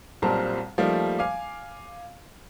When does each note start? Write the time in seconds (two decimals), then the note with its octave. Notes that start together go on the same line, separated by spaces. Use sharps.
0.22 B1 A#2 G3 C4 A5 A#5
0.78 F3 G3 A3 A#3 D#4
1.19 F5 G#5 D6